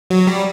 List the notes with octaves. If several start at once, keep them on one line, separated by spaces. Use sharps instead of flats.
F#3
G3